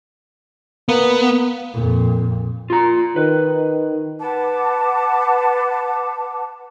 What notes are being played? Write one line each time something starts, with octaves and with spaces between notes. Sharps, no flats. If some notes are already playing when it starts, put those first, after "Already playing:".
A#3 B3
F2 A#2
F4 A#5
D#3 B4
B4 F#5 A5 D6